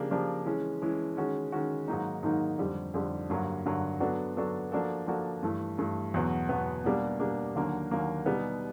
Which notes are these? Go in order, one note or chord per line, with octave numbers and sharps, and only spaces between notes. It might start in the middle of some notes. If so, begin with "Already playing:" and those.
Already playing: C#3 F3 A#3 D4 G4
C#3 F3 A#3 D4 G4
E3 G#3 C#4
E3 G#3 C#4
D#3 G#3 C#4 F#4
D#3 G#3 C#4 F#4
G#2 D#3 F#3 A#3 D#4
G#2 D#3 F#3 A#3 D#4
F2 D3 G3
F2 D3 G3
G2 D3 F#3 A#3
G2 D3 F#3 A#3
F#3 B3 D4 F#4 A4
F#3 B3 D4 F#4 A4
F3 A#3 D4 F#4 A4
F3 A#3 D4 F#4 A4
G2 E3 A3
G2 E3 A3
E2 B2 F#3 B3
E2 B2 F#3 B3
B2 G3 A#3 D4
B2 G3 A#3 D4
D#2 D3 F#3 A#3
D#2 D3 F#3 A#3
B2 G3 B3 D#4